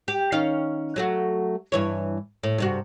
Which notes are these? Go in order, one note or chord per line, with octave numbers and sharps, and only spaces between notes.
G4
D#3 C#4 F5
F#3 A3 F#4
G2 E3 C#5
A2
G2 C3 F#4